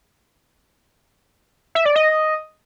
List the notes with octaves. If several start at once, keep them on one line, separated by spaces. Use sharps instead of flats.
E5
D5
D#5